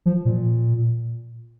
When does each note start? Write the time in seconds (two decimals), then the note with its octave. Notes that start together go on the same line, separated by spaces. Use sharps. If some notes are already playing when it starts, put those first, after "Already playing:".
0.06 F3
0.25 A#2